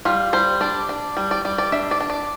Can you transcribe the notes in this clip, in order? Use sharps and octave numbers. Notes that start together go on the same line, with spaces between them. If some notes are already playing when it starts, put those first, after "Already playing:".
G3 F4
G3 C5
D4 D5
D4
G3
D5
G3 D5
D5
D4 E5
D5
D4
D5